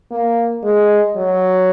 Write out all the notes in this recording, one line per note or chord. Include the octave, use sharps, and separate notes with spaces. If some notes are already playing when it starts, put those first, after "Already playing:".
A#3
G#3
F#3